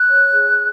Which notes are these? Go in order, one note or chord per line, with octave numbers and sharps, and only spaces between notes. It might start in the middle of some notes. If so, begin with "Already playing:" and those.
Already playing: F#6
C#5
G#4